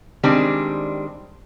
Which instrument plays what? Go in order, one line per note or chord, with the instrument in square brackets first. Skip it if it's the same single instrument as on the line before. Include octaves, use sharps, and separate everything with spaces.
[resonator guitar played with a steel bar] D#3 G3 G#3 C4 D4